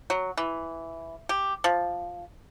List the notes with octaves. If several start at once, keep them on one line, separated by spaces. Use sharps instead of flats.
F#3
E3
G4
F3